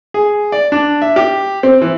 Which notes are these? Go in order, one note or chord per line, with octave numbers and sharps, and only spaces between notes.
G#4
D5
D4
E5
G4
C4
E3